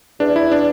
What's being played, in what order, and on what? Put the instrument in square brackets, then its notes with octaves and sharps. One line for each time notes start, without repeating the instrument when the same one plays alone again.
[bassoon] E2 [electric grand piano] D4
[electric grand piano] E4
D4